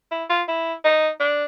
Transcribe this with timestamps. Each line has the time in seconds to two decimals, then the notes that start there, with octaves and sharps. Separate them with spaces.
0.11 E4
0.30 F4
0.48 E4
0.84 D#4
1.20 D4